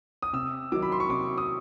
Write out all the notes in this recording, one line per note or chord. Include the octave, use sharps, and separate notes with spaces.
D#6
C3 E6
D#3 F#3 D6
B5
C6
C#6
C3 D6
D#6